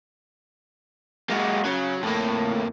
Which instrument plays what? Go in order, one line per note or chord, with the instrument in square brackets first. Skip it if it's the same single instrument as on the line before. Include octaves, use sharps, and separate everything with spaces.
[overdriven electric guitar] G#3 G4 [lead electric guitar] A#3 F#4
[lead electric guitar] C#3 [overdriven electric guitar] F#3
[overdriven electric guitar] F2 A#3 [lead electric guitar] A2